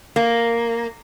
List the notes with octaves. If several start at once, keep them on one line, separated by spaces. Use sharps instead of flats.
A#3